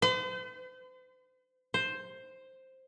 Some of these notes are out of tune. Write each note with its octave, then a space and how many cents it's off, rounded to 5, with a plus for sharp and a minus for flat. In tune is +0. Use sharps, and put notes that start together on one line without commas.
C5 -45
C5 +5